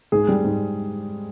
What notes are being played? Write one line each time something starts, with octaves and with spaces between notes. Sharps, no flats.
G#2 G#4
G3
G#2